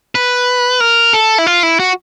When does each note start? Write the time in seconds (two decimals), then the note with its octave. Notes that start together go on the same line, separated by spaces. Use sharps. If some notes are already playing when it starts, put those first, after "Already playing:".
0.15 B4
0.80 A#4
1.13 A4
1.38 E4
1.46 F4
1.63 E4
1.80 F#4